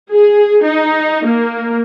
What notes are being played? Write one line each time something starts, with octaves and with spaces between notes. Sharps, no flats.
G#4
D#4
A#3